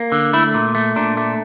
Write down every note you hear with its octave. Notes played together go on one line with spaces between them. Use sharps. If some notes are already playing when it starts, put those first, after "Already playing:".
Already playing: A#3
D3
A3 E4
A#2
A3
A#2 D4
A3